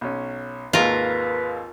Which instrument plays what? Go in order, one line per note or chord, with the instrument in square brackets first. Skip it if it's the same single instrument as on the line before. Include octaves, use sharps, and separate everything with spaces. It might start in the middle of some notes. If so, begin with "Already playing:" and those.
[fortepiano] B1 C#4
[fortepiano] G#1 D#2 G#3 [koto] F4 A#4 [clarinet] B4